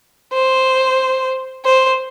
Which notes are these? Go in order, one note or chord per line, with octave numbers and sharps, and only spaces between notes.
C5
C5